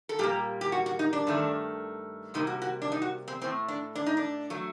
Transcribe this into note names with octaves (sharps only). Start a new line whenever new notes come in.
A4
A#2 G3 A#3 G4
G4
F#4
F#4
D#4
D4
G2 D#3 A3
C3 G3 A#3 D#4
F#4
F#4
D4
D#4
F#4
C4
A2 A3 C4
D4
D4
D#4
D4
F#3 A3